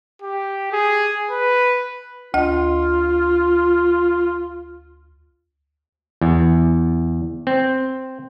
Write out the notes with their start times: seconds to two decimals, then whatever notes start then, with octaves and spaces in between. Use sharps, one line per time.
0.22 G4
0.73 G#4
1.31 B4
2.34 D2 F4 D#5
6.21 E2
7.47 C4